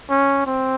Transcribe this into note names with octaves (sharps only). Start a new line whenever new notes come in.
C#4
C4